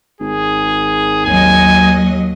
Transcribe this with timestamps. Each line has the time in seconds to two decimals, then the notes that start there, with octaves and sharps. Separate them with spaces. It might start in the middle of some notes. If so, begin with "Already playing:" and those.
0.21 G#1 G#4
1.25 D#2 F#3 D#5 G#5